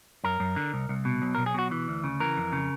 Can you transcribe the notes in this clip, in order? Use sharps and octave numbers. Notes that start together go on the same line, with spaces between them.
F#2 A#4
F#2
D3
C2
C2
B2
B1
A#4
B1
G#4
B2 F#4
E3
D2
C#3
E3 A#4
F2
C#3